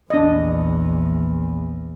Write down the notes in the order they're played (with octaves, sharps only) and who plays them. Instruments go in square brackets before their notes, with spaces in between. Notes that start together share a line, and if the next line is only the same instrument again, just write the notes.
[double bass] A#1 E2 [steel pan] D4 D#5